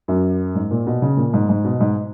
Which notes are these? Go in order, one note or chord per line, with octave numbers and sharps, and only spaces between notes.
F#2
G#2
A#2
B2
C#3
A#2
G#2
G#2
B2
G#2